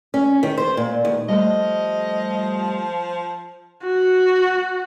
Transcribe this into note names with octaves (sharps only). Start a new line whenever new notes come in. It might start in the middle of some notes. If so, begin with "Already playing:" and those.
C#4
D#3
C5
A#2
D#2
F3 G3 A3 D#5
F#4